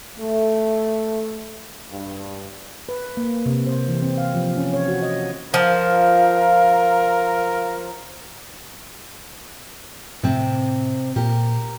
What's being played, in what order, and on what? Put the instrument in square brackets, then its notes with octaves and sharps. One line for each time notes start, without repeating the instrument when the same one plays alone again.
[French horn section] A3
G2
[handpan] B4
A#3
C3
C5
E3
C4
F5
F3
C#4
C#5
F#4
D#5
[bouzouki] F3 [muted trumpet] A#4 [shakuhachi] F5
[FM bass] A2 [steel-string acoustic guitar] C3 C4
[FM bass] A#2 [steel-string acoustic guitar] G4 A#4